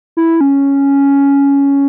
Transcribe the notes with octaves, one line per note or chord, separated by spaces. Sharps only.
E4
C#4